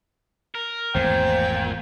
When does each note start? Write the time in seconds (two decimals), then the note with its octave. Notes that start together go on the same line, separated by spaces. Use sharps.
0.55 A#4
0.94 G#1 E2 A#2 A3 C4 G5